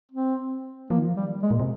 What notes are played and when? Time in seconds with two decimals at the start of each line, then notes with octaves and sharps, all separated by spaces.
0.12 C4
0.90 F3 A#3
0.97 D#3
1.05 F3
1.16 G3
1.42 G#3
1.51 A#2
1.60 C3